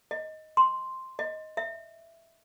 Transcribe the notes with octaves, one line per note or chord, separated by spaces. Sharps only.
D#5
C6
D#5
E5